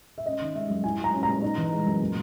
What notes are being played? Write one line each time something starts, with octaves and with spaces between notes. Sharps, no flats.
E5
C#4 D#5
D#3
G#3 E5
F#2
E4 G#5
F#3 A#5
C#4
A#5
A#2
D#4
E3
G#3
F#2
A#2